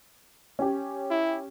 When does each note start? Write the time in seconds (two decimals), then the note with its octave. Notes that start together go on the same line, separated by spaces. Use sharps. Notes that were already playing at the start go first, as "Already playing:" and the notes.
0.59 C#4 G4
1.11 E4